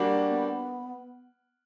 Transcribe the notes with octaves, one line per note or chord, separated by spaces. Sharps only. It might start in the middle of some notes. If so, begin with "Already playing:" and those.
Already playing: G3 A#3 D4 F#4
B3